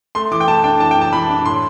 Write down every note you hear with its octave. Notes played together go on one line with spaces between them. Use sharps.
A3 C6
E3 D6
G5
A3 A5
D4 G5
E3 A5
G5
E3 A5
E3 B5
D4
A2 C6